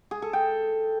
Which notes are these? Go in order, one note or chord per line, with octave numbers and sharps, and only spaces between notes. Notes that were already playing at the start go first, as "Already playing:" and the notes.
G#4
A4
G5